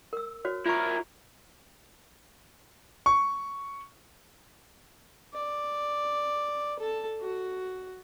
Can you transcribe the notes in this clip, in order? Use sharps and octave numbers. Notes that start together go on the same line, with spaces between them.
A#4 E6
F#4 C5 C#5
E4 F4 A#4 C#6
C#6
D5
A4 A5
F#4